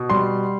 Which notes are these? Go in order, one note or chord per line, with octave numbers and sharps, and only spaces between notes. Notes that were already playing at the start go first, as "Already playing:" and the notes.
Already playing: B2
G3 C6